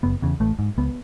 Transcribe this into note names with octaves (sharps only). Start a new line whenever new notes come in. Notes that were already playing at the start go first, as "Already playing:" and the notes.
F#1 B3
E2 C#3
A1 A3
G#2
C#2 B3